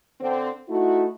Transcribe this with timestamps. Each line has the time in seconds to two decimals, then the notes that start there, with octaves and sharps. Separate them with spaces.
0.20 D3 C4
0.69 A3 D#4 E4 F#4